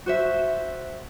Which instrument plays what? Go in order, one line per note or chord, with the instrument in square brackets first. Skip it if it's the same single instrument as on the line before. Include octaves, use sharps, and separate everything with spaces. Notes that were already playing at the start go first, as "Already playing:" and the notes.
[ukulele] F#4 C5 E5